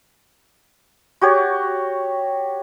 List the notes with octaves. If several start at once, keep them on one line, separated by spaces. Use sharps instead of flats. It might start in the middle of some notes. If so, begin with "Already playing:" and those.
F#4 G4 C#5